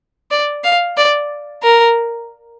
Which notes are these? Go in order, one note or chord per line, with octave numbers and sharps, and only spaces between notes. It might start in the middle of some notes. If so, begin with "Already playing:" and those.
D5
F5
D5
A#4